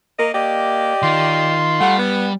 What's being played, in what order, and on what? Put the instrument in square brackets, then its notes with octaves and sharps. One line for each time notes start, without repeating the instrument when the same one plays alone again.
[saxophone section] A#3 A#4 D#5
[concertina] A#3 [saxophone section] G4 D5 D#5
[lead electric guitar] D#3 [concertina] F4 C6
[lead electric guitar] G3 [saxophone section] A3 F#5
[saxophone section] B3